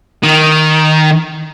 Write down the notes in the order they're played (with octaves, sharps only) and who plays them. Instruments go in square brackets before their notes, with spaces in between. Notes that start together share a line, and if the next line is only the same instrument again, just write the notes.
[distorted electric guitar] D#3